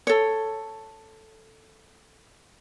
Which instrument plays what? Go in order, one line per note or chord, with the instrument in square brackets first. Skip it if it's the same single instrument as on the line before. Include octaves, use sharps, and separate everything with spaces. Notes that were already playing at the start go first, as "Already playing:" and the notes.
[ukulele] A4 C#5